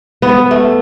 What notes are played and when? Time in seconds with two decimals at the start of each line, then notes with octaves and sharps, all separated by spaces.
0.22 B3
0.51 A3